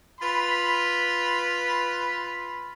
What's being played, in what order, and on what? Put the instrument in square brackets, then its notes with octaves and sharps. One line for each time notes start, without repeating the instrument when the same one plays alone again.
[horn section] F4 B4 B5